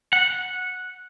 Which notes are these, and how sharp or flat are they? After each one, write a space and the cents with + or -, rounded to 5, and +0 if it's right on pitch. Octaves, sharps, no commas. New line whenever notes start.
F#5 -10